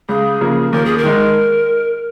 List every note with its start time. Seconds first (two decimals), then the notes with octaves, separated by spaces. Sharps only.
0.09 C#2 G#4
0.41 C#3 F3 A#3
0.72 D#2 A#4
0.85 G#4
0.98 A#4
1.03 D#3 G#3 D#4